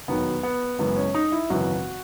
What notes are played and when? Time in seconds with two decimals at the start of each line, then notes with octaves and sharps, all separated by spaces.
0.08 E1 D#2 D#3 F#3 B3
0.43 B3
0.79 F#1 F#2 E3 G#3 B3
0.96 C#4
1.14 D#4
1.32 E4
1.50 G#1 F#2 C#3 E3 F#4